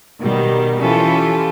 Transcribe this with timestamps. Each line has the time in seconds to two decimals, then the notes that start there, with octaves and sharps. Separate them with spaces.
0.21 B2 D#3 G3
0.81 E3 C#4 F4 G4 A4